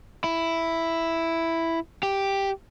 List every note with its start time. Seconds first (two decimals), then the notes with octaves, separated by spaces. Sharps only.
0.24 E4
2.03 G4